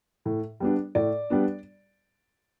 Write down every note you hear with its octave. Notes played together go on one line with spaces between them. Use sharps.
A2
G3 B3 D4
A2 D5
G3 B3 D4